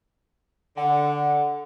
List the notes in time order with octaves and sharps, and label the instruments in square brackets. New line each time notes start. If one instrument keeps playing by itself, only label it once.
[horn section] D3 [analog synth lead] F#5